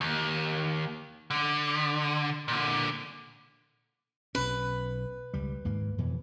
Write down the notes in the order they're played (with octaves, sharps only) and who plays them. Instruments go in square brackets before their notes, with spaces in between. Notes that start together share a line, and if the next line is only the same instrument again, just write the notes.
[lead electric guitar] D#2
D3
A#2 D3
[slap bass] B1 C#4 [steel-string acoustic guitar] B4
[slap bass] C#2 G3
D#2 G#2 A#3
F2 B2 E3